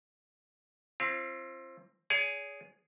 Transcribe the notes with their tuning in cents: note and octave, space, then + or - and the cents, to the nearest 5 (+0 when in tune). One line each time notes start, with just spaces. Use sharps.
C4 +20 F4 -35
G#4 +0 C#5 +45